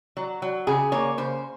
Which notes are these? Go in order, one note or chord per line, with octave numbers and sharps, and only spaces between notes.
F#3
F#3
C#3 G#4
A#3 C#5
C#3 C5